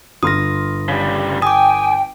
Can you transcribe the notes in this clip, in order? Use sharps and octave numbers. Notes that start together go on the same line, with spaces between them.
G1 C6 D#6 F6 A#6
C#3 G3
G5 G#5 D6 D#6